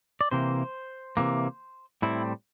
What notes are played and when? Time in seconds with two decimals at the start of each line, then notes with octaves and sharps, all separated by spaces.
0.21 D5
0.31 C3 E3 A#3 C5
1.17 C3 E3 A#3
2.02 A2 G3 C4 E4